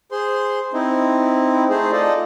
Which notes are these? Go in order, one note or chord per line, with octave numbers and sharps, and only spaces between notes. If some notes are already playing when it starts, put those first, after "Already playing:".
G#4 C5 C6
C4 D#4 E4
A3 D#4 G#4 C5
F4 A4 D5 D#5